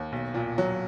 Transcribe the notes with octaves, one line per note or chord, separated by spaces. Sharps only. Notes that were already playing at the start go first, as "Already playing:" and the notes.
Already playing: D#2
B1
A#2
F#3